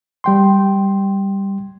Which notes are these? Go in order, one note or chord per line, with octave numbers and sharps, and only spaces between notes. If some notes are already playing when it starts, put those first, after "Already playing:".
G3 G5 C6